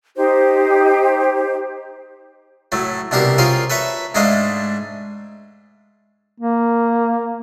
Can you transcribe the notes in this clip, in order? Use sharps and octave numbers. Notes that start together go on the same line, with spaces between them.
D#4 G4 C5
A2 F#3 A3
C2 B2 D4 G4 A#4 C5
C#4 F4 G#4 A#4 C5 G5
A4 B4 C#5 E5 A#5
G#2 G#3 A3 D4 D#5 F5
A#3